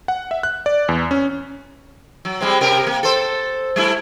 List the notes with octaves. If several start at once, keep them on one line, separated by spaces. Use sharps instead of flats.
F#5
E5
F#6
D5
E2
C#4
F#3
G3 G#3 C4
C3 G4 A#4
A#3
A4 C5
G3 A3 E4